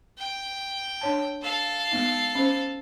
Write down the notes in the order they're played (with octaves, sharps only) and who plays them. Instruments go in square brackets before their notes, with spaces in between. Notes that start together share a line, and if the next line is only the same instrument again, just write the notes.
[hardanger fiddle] G5
[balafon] D4 C#5 A5
[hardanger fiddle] A4 F5
[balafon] G#3 B3 D#4
C#4 C5